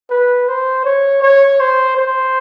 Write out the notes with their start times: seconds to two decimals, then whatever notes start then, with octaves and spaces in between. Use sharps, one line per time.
0.10 B4
0.48 C5
0.85 C#5
1.22 C#5
1.60 C5
1.97 C5